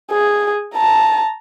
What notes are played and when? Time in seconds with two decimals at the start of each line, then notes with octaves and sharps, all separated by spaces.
0.12 G#4
0.75 A5 A#5